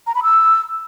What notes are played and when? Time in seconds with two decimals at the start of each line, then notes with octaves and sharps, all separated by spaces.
0.07 A#5
0.15 B5
0.23 E6